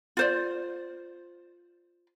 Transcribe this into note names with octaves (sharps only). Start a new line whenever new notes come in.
F4 C5 D5